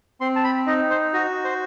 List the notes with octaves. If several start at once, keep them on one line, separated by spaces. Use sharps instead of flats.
C4 C6
A5
B5
D#4 D#5
C5
F#4 D#5
C5